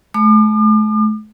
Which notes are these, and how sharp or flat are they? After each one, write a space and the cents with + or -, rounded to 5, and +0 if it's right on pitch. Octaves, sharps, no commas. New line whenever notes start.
A3 -40 D6 +45